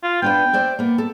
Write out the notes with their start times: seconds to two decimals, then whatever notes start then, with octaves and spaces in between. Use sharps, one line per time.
0.03 F4
0.22 B3 D4 B4 G5
0.53 C5 D5 E5
0.79 A#3 B3
0.98 A4